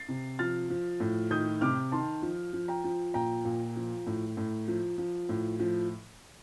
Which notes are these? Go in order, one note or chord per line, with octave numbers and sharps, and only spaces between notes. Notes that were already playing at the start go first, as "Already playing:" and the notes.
Already playing: A6 C7
C3
F3 F6 A6
F3
A2
D#3 D#6 G6
C3 D6 F6
D#3 A5 C6
F3
F3
G5 A#5
F3
A#2 G5 A#5
A#2
F3
A2
A2
F3
F3
A2
F3